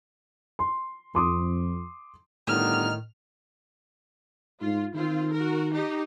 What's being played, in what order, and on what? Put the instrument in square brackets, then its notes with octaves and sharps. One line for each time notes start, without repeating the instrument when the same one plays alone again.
[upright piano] C6
[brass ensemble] F2 [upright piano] C6 D6 D#6
[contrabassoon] G1 [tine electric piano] A2 [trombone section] D3 D#3 D#4 [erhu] F6
[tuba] G#2 [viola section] F4
[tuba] D#3 [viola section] C4 F4
[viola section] F#4 A#4
D#4 G4